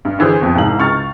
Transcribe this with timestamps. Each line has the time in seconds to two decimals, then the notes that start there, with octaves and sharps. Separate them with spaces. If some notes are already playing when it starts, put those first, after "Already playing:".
0.05 G2
0.19 D3 E3 G#4 C5
0.41 F2 B2
0.55 C2 G#2 F5 F#7
0.79 C#2 C#6 F6 A6